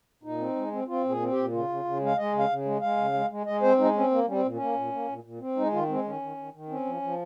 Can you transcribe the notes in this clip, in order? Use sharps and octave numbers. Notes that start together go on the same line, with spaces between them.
A#2 D#4
C4
G#3
C4
C4 F4
A#2
G#4
C4
G4
A#2
C#3 F4
C#3
C#3
G#3 F5
G#3 D#5
C#3
F5
C#3
G#3
G#3 F5
C#3
G#3
G#3
G#3 D#5
C4 C5
G#3 D#4
C4 C#4
A#3
G3 C#4
C4
A#2
C#4
A#3
A#2
A#3
A#2
A#2
C4
G#3 D#4
D#3 F4
G#3 C4
D#3 C#4
D#3
D#3
D#3
C4 C#4
F3
F3